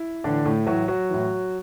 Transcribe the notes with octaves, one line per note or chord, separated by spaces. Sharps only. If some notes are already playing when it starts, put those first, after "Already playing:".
Already playing: E4
A2 D3 E3 D4
A2 A3
A2 E3 F#3 F#4
F#3 F#4
A2 E3